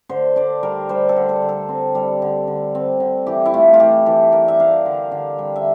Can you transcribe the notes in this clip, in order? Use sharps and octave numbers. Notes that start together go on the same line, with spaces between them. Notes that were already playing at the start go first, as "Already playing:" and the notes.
D3 C5
D4 D5
G3 A#4
G3 C5
A4
D3
A4
D3
A4
C4
G3
D3
D3
C4
D3
E3 G4
E4
A3 F4
F4
E3 G4
E3 A4
D4 A#4
E5
D4 F5
D3
D3
G3
E5